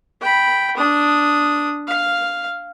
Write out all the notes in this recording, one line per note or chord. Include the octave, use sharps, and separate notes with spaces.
G5 B5
D4 D#6
F5